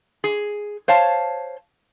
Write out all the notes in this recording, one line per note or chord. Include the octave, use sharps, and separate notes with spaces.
G#4
C5 C#5 F5 A5